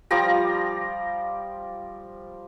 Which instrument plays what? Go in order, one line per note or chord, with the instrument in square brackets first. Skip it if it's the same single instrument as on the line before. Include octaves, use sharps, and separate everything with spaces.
[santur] F3 G3 D5 A#5